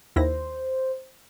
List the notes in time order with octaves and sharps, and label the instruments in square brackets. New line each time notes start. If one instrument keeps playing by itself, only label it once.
[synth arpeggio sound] D#2 E4 A#6 [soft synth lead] C5